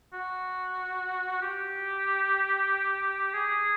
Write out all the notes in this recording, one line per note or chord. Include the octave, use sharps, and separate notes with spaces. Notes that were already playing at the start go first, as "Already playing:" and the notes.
F#4
G4
G#4